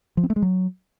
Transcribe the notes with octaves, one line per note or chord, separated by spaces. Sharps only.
F3
C4
A3
G#3
F#3